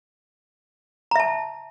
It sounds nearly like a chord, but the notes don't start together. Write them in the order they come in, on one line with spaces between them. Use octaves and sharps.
A#5 E5 A5